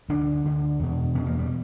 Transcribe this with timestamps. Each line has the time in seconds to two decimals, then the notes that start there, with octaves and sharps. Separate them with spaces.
0.09 D2 D3 D4
0.45 D2 D3
0.79 E2 B2
1.15 E2 B2 C#4
1.27 A#3
1.39 G3